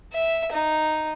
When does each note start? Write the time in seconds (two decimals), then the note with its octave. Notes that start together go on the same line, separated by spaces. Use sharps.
0.14 E5
0.53 D#4